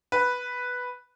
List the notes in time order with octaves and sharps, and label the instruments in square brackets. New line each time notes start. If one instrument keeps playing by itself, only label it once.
[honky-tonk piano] B4